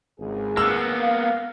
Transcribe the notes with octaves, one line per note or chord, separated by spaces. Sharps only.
G#1 C#2 G#4
A#3 B3 E6
F5